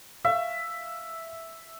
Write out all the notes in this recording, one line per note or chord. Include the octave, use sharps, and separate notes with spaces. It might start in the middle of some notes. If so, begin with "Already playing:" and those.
E5 F5